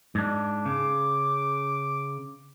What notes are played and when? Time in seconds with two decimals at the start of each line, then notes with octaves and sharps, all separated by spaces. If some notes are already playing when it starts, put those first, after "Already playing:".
0.15 G#2 D4
0.66 C#3 D6